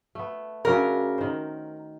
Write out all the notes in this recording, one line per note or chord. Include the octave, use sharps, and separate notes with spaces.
A3 B3
C#3 F#3 D4 A#4
D#3 C5